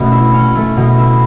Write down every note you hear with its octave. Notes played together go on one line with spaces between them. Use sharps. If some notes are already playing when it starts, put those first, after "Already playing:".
Already playing: B2 A3 C#4
E4
C#4
A3
B2
E4